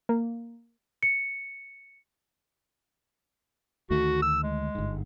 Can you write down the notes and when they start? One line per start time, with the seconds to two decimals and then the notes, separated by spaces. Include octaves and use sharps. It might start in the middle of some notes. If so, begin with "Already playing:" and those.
0.09 A#3
1.03 C#7
3.90 D2 D#3 A3 F#4
4.22 E6
4.43 G#3
4.75 G1 G#2